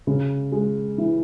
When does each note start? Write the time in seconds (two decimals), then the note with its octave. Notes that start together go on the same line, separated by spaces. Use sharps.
0.07 C#3
0.52 G#3
0.98 E3